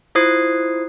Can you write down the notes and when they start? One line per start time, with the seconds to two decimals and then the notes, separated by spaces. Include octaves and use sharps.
0.15 E4 F4 C5 D#6 G#6 C7